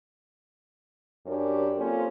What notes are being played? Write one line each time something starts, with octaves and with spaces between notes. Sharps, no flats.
F#2 C#4 D4 G4 A#4 C#5
A#3 C4 C#4 F4 A4 C5